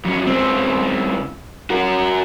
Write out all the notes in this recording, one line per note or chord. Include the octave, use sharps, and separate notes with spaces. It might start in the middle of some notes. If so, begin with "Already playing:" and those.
F2 F#3
C#2 C4
F#4 A#4